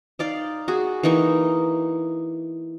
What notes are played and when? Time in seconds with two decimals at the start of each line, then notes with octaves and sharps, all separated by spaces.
0.19 D#4 D5 F5
0.68 F#4 G#4
1.03 E3 A#3 D#4 C#6